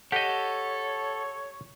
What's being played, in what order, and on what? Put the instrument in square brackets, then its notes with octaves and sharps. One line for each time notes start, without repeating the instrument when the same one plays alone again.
[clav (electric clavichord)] G4 D#5 [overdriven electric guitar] A4 [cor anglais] C#5 [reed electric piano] F#5